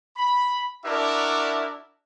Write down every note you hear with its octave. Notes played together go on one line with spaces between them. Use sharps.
B5
D4 E4 F#4 A#4 D5 E5